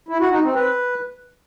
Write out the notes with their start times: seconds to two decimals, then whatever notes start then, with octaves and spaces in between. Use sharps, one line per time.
0.09 E4
0.20 F#4
0.32 D#4
0.43 C4
0.55 B4